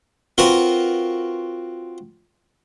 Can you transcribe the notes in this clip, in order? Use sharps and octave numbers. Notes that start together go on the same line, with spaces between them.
C4 F4 F#4 A#4 B4